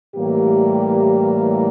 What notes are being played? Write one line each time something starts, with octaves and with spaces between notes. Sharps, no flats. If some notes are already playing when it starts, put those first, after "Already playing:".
A2 E3 G3 A#3 G4